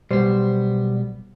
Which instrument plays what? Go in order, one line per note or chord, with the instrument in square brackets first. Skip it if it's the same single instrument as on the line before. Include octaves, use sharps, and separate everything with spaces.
[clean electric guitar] B1 B3 [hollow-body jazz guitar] G3 C5